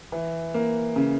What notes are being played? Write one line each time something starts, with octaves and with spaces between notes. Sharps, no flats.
E3
A#3
C#3